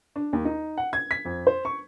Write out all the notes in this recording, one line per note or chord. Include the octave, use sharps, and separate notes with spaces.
D4
D#2
D#4
F#5
G#6
B6
F2
C5
C#6